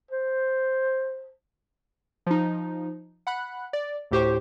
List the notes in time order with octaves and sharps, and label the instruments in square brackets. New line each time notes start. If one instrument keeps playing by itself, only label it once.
[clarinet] C5
[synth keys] F3 D#4
F#5 B5 F#6
D5
D2 A2 G4 C5 C#6